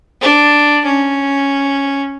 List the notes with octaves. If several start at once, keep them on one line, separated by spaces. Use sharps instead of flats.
D4
C#4